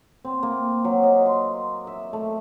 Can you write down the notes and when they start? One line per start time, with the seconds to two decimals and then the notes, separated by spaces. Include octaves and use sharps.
0.25 C4
0.43 A#3
0.84 F#3
1.03 D#5
1.26 C6
1.87 E5
2.13 A3